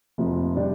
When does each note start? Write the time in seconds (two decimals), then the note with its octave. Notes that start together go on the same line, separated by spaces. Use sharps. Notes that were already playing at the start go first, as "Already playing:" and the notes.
0.18 F1 F2 C3 F3
0.56 C3 G3 D4 G4